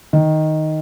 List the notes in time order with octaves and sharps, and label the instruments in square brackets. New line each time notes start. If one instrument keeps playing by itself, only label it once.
[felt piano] D#3